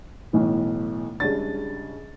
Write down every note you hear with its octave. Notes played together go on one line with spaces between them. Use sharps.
B1 A2 E3
C#2 C#3 G3 D4 A6